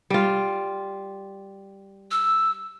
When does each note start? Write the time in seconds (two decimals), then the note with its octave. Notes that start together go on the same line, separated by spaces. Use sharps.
0.10 G3 F4
2.11 E6